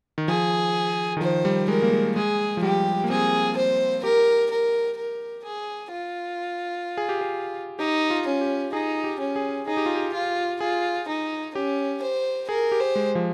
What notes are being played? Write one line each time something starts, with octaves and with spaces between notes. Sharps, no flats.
D#3
F3 G#4
D#3
F3 C5
G3
G#3 A#4
A#3
G#3
G#3 G#4
F3
G3 G4
A#3
C4 G#4
C5
G4 A#4
A#4
A#4
G#4
F4
G#4
G4
G#4
D#4 G4
F4
C#4
G4
D#4 G#4
G4
C#4
G#4
D#4 G#4
G4
F4
G4
F4
F4 G#4
D#4
C#4 G4
C5
G#4 A#4
G4
C5
G#3
F3